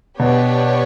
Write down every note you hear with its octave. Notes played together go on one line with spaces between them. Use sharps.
B2 B3 D4 G4 C#5